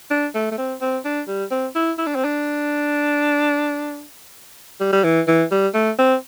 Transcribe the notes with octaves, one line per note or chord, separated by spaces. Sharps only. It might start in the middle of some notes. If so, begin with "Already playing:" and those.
D4
A3
A3
C4
C4
D4
G3
C4
E4
E4
D4
C4
D4
G3
G3
E3
E3
G3
A3
C4